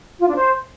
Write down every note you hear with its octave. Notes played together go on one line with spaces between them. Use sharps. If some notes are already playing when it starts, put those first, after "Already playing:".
F4
D4
C5